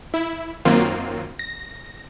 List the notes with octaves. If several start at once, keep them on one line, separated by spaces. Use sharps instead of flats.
E4
F#2 D#3 F#3 A#3 C4 F4
A#6